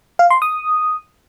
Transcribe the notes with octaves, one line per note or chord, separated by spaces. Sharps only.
F5
C6
D#6